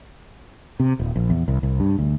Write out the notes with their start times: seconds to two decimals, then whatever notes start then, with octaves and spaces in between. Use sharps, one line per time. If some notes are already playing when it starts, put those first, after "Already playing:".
0.80 C3
1.00 D#1
1.16 A#1
1.30 E2
1.48 C2
1.63 C2
1.80 G2
1.99 D2